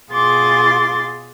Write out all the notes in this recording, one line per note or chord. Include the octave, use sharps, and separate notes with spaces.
B2 F4 G#4 C6 D6 A6